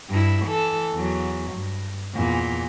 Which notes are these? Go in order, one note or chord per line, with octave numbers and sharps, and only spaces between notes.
G2 E4
E3 A4
E2 F#3
G2
E2 A#2